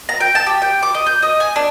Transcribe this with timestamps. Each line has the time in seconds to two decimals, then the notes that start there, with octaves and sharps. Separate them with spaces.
0.09 A#5
0.20 G5
0.35 A5
0.46 G4
0.62 G5
0.83 D6
0.94 D#5
1.07 G6
1.22 D#5
1.40 G#5
1.56 D4